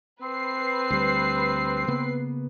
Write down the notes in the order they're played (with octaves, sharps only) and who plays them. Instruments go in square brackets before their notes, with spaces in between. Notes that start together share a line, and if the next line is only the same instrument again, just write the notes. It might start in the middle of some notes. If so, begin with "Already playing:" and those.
[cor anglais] C4 [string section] B4 C7
[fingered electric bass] D2 G3
C#3 A#3 B3